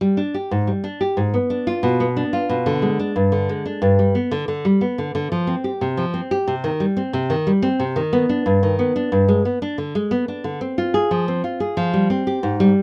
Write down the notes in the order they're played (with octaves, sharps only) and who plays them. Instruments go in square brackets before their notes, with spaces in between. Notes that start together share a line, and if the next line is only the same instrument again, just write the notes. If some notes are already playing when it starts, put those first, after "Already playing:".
[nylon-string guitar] G3
D4
G4
G#2
G3
D4
G4
G#2
B3
D4
F4
B2
B3
D4
F4
B2
D3
G#3
D4
G2
D3
G#3
D4
G2
G3
B3
D3
D3
G3
B3
D3
D3
F3
C4
G4
C3
F3
C4
G4
C3
D#3
G3
C4
C3
D#3
G3
C4
C3
D#3
B3
D4
G2
D#3
B3
D4
G2
G#3
B3
D4
D3
G#3
B3
D4
D3
C4
F4
G#4
F3
C4
F4
G#4
F3
G3
C4
G4
G#2
G3